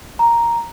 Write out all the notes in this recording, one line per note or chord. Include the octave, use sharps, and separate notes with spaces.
A#5